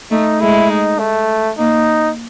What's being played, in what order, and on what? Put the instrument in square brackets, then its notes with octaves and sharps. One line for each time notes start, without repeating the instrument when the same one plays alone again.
[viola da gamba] A3 [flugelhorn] D#4
[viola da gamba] G#3 [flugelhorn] E4
[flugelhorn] D#4
A3
[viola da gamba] A#3 [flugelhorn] D#4